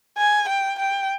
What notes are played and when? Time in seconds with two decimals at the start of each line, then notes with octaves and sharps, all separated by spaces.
0.17 G#5
0.49 G5
0.79 G5